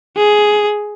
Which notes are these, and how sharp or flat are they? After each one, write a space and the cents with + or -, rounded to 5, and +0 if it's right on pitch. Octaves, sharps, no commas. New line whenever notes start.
G#4 +10